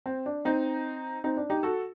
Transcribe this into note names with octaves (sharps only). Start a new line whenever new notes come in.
C4
D4
C4 D#4
C4 D#4
D4
D#4 G4
F#4 A4